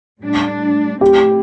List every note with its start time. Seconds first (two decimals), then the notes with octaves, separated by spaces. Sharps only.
0.21 A2 G3 D4
1.01 A2 F#3 A3 C4 E4 G4